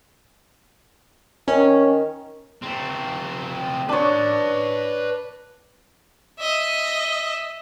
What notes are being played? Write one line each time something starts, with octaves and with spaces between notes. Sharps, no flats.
D#3 C#4
A3 C4
D4 B4 C#5 A5
D#5 E5